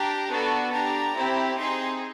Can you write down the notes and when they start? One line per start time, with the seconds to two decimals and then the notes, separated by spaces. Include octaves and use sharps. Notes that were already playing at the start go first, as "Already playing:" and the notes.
Already playing: D4 G4 A#5
0.29 B3 D4 F#4 A4
0.71 D4 G4 A#5
1.15 C4 E4 G4
1.57 C4 D#4 G#4 C6